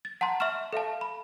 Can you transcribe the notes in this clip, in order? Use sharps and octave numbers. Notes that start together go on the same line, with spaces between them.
A6
F#5 A5 A#5 C6
E5 C6 C#6 F6 E7
A4 E5 F5 A5
B5